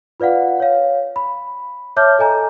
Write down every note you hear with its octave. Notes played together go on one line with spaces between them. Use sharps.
F4 B4 D5 F5 F#5
C#5 F5
B5
C#5 E5 A5 D6 F6 G6
A4 D#5 G#5 A#5